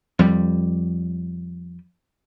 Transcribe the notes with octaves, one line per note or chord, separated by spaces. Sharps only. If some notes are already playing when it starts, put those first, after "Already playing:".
F2 G3